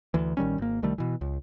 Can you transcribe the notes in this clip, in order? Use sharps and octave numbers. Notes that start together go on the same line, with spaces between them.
D2 E3
A1 D#3 G3 C#4
G#1 A#3
C2 D#3 G3 A3
B2 E3
C#2